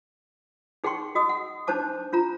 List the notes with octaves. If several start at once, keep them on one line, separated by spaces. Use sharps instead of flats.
D#4 G#4 F#5 G5 C6 C#6
F#4 D#5 D#6 E6
F#5
D4 D#4 C5 A5 D6
D4 F4 A#5